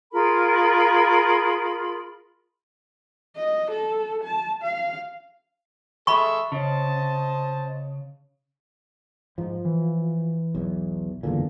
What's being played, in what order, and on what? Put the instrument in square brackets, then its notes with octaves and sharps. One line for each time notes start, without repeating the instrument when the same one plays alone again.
[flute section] F4 G#4 A#4 B5
[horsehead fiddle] D#5
A4
A5
F5
[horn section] G#3 A4 E5 [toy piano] B5 C#6
[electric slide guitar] C#3 [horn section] C5 D#5 A5
[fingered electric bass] G#2 [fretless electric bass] F3
[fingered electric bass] E3
[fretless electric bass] B1 E2
[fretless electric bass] F#1 E2 A#2 [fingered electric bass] D3